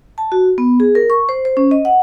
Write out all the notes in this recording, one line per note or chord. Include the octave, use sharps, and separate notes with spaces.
A5
F#4
B3
G#4
A#4
C#6
C5
C5
C#4
D#5
F#5